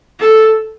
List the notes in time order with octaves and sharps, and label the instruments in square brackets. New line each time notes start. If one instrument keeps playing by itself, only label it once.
[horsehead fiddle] A4